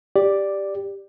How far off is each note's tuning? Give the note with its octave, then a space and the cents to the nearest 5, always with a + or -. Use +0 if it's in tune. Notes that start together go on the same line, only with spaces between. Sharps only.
G4 +5 D5 +0